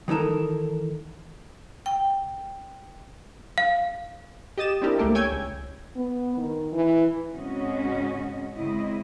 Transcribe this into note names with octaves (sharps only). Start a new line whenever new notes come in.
D#3 E3 D#4 A4 A#4
G5
F5
G4 D#5 D#6 A6 E7
C4 D4 E4 G4 A#4
C#2 A3 A#3 G4 A4
C#5 G5 G#5 E6 G6 G#6
C#2
B3
D#3
E3
G#2 C#3 C4 C#4 F#4 D#5
G#2 C#3 C4 E4 D#5